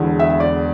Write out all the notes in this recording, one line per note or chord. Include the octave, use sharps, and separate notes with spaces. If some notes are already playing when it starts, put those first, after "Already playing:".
Already playing: E1 E2 D3
E5
E5
D5